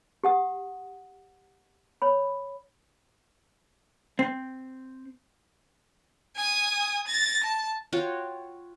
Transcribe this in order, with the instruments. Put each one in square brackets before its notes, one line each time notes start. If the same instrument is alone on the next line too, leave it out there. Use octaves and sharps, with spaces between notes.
[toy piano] G4 F#5 D#6
C#5 B5
[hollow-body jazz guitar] C4
[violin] G#5 D#6
A6 A#6
A5
[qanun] F4 F#4 C#5 G5